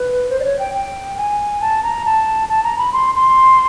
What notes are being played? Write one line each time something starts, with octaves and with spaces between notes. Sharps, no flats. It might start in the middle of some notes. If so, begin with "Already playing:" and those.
Already playing: B4
C5
D5
C#5
G5
G5
G#5
A5
A#5
A5
A5
A#5
B5
C6
C6